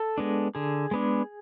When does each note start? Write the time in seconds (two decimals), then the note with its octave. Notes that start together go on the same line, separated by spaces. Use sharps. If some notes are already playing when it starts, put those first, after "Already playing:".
Already playing: A4
0.18 G#3 B3 D4
0.55 D3 G#4
0.91 G#3 B3 D4